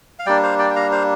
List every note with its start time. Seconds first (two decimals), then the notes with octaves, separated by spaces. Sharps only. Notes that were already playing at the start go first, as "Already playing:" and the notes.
0.19 F5
0.26 G3 A#3 D4 D5 G5
0.43 C5 F5
0.59 D5 G5
0.70 G5
0.75 F5 A#5
0.92 C5 F5